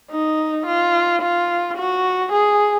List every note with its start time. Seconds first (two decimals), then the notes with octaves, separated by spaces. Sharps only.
0.11 D#4
0.66 F4
1.21 F4
1.77 F#4
2.32 G#4